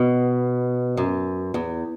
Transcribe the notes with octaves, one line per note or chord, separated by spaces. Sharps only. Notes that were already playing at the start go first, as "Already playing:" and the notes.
Already playing: B2
F#2
E2